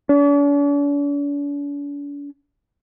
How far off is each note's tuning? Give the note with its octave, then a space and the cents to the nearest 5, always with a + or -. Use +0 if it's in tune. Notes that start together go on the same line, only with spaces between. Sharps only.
D4 -45